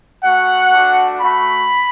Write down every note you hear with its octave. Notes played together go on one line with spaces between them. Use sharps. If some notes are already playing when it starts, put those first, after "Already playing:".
A3 F#4 F#5
A3 D4 F#4
A3 F#4 B5